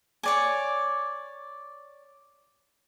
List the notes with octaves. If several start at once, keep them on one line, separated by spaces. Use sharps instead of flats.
C#5 D5 G#5